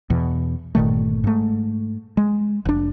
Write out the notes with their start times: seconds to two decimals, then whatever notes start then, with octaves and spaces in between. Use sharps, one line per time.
0.10 E2 B2
0.75 G1 A#2 D#3 A3
1.24 G#2 A3
2.17 G#3
2.65 F1 D4